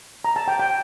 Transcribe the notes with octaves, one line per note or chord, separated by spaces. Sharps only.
A#5
A5
G5
G5